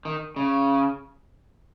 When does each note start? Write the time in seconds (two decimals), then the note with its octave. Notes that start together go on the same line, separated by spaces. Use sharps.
0.05 D#3
0.36 C#3